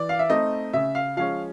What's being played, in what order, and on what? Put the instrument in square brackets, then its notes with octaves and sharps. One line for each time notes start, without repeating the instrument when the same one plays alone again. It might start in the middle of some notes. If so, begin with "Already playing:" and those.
Already playing: [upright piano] E3 D5
F5
E5
A3 C4 D#4 D#5
C#3 E5
F5
F3 G#3 C#4 F5